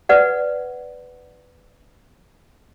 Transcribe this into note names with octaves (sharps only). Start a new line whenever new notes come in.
B4 D5 F#5